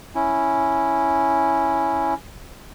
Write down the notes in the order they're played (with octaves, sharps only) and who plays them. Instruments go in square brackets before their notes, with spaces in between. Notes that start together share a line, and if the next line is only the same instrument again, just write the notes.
[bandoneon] C#4 E4